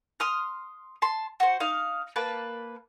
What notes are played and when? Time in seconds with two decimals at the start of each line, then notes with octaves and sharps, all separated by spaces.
0.20 C6 D#6 F6
1.02 A5 C6
1.40 F#4 C5
1.60 D#4 F5
2.16 A#3 B4 A5